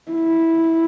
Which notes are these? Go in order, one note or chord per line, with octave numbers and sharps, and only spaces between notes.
E4